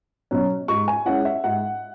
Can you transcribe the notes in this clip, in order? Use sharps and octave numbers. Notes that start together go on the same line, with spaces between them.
B2 F#3 C#4
G#2 C#6
G#5
G#3 C#4 E4 F#5
E5
G#2 F#5